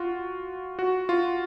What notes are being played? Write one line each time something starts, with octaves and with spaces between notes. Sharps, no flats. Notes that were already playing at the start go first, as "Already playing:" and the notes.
Already playing: F4 F#4
F#4
F4